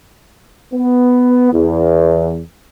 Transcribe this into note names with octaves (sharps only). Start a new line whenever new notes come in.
B3
E2